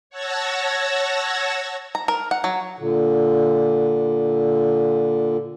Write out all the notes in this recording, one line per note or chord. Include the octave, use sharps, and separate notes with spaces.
C#5 F#5 A5 E6 G#6 A#6
A#5
A#4
F#5
F#3
A#2 D3